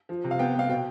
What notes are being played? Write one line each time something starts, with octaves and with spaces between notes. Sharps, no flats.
F3
C3
F5
B3 G5
B3 F5
B2 G5